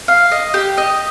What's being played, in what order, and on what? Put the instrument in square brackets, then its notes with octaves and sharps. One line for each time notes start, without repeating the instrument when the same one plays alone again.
[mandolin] F5
D#5
G4
D#5